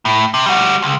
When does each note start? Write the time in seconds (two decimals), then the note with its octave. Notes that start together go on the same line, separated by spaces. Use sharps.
0.05 A2
0.34 C3
0.46 G3 F#4
0.82 C#2